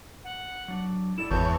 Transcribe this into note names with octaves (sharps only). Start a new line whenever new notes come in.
F#5
F#3 D4
E4 A4 D5 E7
G#1 E2 C#5 A5 G6